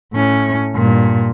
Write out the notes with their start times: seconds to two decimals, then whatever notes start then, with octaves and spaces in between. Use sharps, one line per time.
0.13 A2 C#4
0.74 G2 A#2